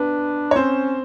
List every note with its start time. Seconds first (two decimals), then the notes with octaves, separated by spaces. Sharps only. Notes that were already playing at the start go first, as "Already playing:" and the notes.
Already playing: B3 D4 B4
0.51 C#5
0.55 C4 C#4 C5